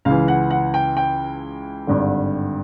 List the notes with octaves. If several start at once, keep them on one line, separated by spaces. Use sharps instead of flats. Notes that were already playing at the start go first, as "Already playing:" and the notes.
C#2 C#3 E3 F5
F#5
F#5
G5
G5
G#1 G2 D3